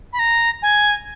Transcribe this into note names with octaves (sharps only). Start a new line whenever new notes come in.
B5
A#5
G#5